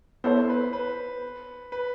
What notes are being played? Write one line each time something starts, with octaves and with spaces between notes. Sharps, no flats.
B3 E4 A4 C5 C#5
B4
B4
B4